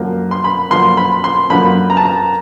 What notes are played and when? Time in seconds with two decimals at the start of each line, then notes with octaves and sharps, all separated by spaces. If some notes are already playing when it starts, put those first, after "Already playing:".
Already playing: F#2 D3 F3 A#3
0.31 C6
0.44 B5
0.70 F#2 D3 F3 A#3 C6
0.97 B5
1.24 C6
1.50 F#2 D3 F3 A#3 B5
1.90 A#5
1.97 A5
2.05 A#5